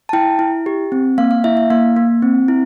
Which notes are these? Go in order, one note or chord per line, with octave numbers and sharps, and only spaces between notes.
A5
E4 G5
E4
G4
C4
A#3 F5
F5
E4 E5
F5
A#3 F5
A#3
C4
E4